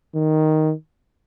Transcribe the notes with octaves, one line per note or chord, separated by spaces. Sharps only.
D#3